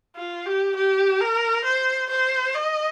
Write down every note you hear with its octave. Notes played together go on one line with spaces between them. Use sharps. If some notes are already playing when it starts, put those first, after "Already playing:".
F4
G4
G4
A#4
C5
C5
D#5